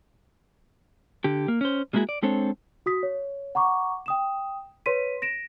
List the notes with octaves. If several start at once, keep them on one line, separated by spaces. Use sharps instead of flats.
D3 G4
A#3
C#4 C5
G3 G#3 A#3 E4 F#4 G#4
D5
G#3 C4 D4 A4 C5 C#5
F#4 D#6 B6
C#5
F#5 A#5 C#6 D6
G5 D#6 E7
B4 C#5 C6 B6 D#7
A#6 D7 E7